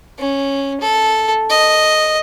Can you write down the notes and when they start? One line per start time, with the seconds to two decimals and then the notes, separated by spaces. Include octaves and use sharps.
0.18 C#4
0.80 A4
1.50 D#5